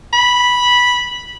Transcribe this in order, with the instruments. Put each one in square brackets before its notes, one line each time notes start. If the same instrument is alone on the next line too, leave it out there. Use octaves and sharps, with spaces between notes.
[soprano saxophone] B5